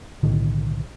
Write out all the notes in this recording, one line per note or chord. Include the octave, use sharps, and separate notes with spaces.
B1 A2 D3 D#3